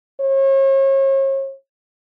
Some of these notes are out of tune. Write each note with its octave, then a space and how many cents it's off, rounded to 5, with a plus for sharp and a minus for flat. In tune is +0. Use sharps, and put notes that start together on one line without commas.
C#5 -40